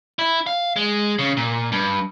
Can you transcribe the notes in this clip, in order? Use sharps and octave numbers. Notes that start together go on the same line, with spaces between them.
E4
F5
G#3
C#3
A#2
G2